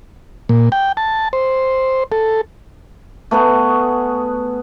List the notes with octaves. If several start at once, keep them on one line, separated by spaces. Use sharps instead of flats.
A#2
G5
A5
C5
A4
A3 B3 G#4 F#5